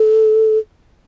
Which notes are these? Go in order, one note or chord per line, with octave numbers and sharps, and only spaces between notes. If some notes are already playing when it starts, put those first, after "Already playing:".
Already playing: A4